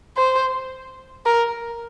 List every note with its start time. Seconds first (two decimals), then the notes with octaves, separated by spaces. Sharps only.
0.17 C5
1.26 A#4